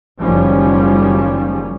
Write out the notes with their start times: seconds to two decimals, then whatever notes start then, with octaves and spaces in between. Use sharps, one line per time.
0.21 F#1 D#3 F3 G3 C#4